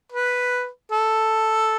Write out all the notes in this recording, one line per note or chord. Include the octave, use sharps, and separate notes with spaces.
B4
A4